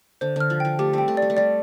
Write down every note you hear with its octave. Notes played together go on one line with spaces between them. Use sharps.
D3 C5
D3 F6
F3
F3 G5
A3 G4
G3 C4 G5
A3
G3 D5
A3
G3 D5